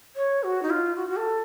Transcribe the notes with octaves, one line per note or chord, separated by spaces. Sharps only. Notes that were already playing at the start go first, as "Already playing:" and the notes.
C#5
F#4
D#4
F4
F#4
F#4
A4